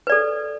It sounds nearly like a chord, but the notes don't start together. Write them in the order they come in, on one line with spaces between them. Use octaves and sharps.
B4 D5 A4